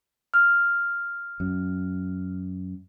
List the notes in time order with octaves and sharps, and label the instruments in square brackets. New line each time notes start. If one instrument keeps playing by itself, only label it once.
[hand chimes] F6
[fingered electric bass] F#2